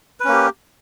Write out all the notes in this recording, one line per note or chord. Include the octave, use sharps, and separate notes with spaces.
A#3 C#4 G4 B4